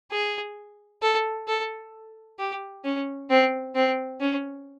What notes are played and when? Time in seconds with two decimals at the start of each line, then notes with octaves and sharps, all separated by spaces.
0.11 G#4
1.02 A4
1.48 A4
2.39 G4
2.84 C#4
3.30 C4
3.75 C4
4.20 C#4